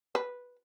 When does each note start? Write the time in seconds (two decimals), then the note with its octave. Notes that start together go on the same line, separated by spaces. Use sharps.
0.15 B4